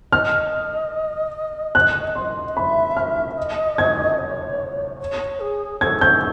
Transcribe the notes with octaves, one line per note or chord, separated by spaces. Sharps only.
D#5 F6
F#6
C6
E5 B5
F6
D#5
G#6
C#5
C#5
G#4
A4 G#6
G6